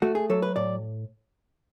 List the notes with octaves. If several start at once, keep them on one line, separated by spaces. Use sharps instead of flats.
A3 F#4
G#4
F#3 A4
B4
A2 D5